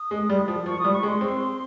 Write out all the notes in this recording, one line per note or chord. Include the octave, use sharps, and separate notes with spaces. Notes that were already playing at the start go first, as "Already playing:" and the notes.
Already playing: D#6
G#3
G3
F3
F3 C#6
D#6
G3
C#6
G#3
C6
C4